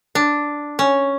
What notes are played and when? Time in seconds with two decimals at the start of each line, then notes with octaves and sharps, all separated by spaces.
0.15 D4
0.79 C#4